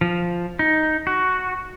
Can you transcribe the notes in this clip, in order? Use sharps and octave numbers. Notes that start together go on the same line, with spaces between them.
F3
D#4
F#4